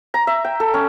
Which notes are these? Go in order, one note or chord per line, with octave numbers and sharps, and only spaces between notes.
A#5
E5
G5
A4
C#4